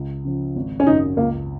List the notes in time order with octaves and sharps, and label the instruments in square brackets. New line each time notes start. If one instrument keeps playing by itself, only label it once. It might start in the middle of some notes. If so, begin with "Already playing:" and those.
Already playing: [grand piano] C#2
C#3 F3
G#1
[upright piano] C#4
[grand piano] F#2 C#3 F#3 [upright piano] D#4
[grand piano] C#2 [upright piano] A#3